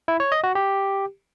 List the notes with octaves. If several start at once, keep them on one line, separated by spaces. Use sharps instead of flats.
E4
C#5
D#5
F#4
G4